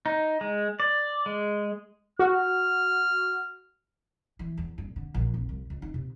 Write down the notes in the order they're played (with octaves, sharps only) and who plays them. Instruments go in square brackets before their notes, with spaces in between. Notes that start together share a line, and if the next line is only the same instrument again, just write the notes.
[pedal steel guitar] D#4
G#3
D5
G#3
[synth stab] F#4 [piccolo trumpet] F6
[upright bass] E3
E2
G2
D3
A#1
F1
C2
C#2
D#4
C3